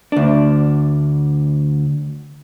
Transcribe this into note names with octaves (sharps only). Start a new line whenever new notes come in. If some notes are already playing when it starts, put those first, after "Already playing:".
D2 D4